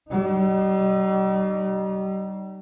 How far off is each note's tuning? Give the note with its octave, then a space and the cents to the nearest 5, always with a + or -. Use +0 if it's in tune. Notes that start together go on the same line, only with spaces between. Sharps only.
G3 -40 D#4 -20